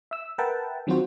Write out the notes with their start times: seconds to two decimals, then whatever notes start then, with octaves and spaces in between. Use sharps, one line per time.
0.11 E5 E6
0.38 A#4 B4 E5 F#5 G5 A5
0.87 D#3 F#3 C4 F4 F#4 C5